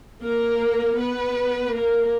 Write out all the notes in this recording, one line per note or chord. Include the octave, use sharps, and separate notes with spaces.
A#3 A#4
B3 B4
A#3 A#4